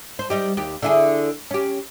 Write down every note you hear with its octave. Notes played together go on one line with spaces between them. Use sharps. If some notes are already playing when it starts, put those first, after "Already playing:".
C5
G3 D#4 G4
D#2 G4
D3 E4 G#4
C#4 G4